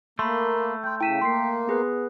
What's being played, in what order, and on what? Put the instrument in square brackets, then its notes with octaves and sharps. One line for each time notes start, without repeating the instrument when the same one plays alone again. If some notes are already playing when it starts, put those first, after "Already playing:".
[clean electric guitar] A3 [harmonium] A#3 [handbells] B5 C6
[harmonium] G5 [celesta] C6 G6
[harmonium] C#3 [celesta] E4 D#7 E7 [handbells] G5 B6
[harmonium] A#3 [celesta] C6 C7
[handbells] B3 G#4 B4